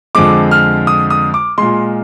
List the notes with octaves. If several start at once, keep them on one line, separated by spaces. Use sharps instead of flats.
F2 D3 F3 G#3 D6
F6
D#6
D#6
D6
A#2 G#3 C6